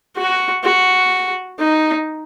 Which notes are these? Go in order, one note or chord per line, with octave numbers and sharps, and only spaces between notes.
F#4
F#4
D#4